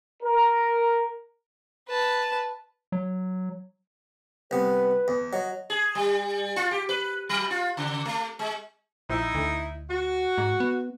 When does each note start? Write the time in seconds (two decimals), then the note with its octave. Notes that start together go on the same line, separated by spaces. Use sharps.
0.23 A#4
1.88 B4 A5
2.92 F#3
4.51 C2 B3 B4
5.08 E2
5.33 F#3 D#5
5.70 G#4
5.95 G3
6.56 F4
6.71 G4
6.89 B4
7.29 F#3
7.51 F4
7.77 C#3
8.05 A3
8.39 G#3
9.10 A#1 D#4 E4
9.35 D2
9.89 F#4
10.38 G#2
10.60 B3